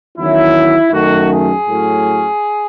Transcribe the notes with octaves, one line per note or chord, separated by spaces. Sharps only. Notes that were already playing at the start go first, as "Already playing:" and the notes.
E2 D#3 F#3 C#4 E4
F#2 D#3 A3 F#4
G#4
A2 F#3 A3 C#4